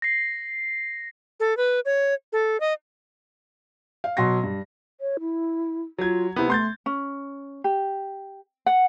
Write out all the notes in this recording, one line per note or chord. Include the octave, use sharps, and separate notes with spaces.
A#6 C7
A4
B4
C#5
A4
D#5
F5
B2 F#3 C6 A#6
G2
C#5
E4
F#3 F4 G#6
C3 B3 E4
A3 C6 G6 A6
C#4
G4
F#5